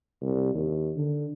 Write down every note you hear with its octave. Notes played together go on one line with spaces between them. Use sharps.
C2
D#2
D3